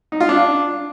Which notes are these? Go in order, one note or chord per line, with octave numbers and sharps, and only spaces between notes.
D#4
F4
D4